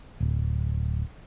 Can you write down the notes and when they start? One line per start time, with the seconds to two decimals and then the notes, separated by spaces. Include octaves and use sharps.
0.20 D1